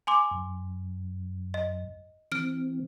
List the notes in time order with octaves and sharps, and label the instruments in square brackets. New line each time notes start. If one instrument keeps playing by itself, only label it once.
[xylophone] G#5 C6 D6
[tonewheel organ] F#2
[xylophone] D#5
[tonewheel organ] E3 C4 [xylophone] F6 D7